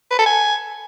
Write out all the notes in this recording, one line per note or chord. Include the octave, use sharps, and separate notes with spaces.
B4
A4
G#5